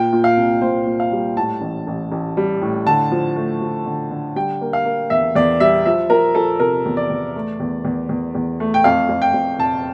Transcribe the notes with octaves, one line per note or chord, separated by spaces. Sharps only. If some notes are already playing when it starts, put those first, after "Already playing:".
Already playing: A#2 G5
A#2
F5
C2
A#2 C5
A#2
F5
G3
A2 A5
A1
A1
A1
G3
A2
D3 A5
F3
A3
F3
D3
D3
G3 G5
A#3
F5
A#3
E2 E5
E2 D5
G3 E5
F3 E5
F3 A#4
F3 A4
C3 A#4
E2
D5
E2
A3
E2
E2
E2
E2
A3
G5
F2 F5
F2
G5
F2
F1 A5